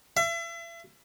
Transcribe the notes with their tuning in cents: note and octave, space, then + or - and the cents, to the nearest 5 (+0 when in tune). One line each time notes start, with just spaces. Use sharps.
E5 +35